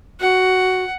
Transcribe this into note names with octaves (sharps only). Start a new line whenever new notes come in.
F#4 F#5